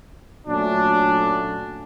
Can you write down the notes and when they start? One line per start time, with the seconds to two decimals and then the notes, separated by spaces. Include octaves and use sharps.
0.47 A#2 F#3 A3 C#4 D4